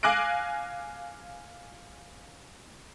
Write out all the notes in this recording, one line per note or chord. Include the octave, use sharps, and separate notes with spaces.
F5 G#5 D6 F#6 A#6 D7